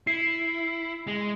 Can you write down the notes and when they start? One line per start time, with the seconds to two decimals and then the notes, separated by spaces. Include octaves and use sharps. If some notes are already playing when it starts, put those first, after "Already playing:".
0.07 E4 C7
1.07 G#3